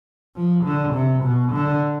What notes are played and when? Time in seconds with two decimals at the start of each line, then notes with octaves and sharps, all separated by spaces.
0.36 F3
0.64 D3
0.94 C3
1.24 B2
1.52 D3